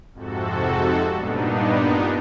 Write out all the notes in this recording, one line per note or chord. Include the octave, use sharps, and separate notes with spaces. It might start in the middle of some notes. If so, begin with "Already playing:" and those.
F2 G#2 C3 F#4 A4
G2 A#2 B3 D4 D#4